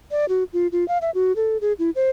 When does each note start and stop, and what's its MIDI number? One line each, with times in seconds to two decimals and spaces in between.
0.11 0.25 74
0.29 0.44 66
0.53 0.67 65
0.72 0.87 65
0.88 0.98 77
1.02 1.10 76
1.14 1.35 66
1.36 1.57 69
1.61 1.73 68
1.79 1.90 64
1.95 2.10 72